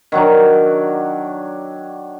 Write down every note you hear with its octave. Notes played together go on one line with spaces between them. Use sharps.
D#3 F#3 D4